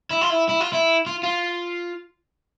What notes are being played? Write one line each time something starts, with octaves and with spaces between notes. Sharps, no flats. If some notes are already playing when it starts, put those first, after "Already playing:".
E4
F4
E4
E4
F4
E4
F4
F4